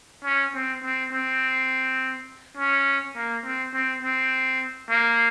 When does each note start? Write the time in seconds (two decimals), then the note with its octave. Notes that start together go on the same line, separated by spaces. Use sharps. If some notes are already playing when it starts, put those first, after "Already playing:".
0.24 C#4
0.54 C4
0.84 C4
1.12 C4
2.57 C#4
3.16 A#3
3.45 C4
3.74 C4
4.03 C4
4.90 A#3